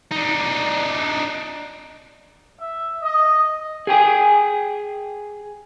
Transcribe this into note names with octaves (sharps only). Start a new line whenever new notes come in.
D4 D#4
E5
D#5
G#4 G5 G#5